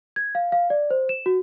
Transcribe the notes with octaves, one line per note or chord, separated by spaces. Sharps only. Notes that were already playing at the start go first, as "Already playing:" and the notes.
G#6
F5
F5
D5
C5
E7
F#4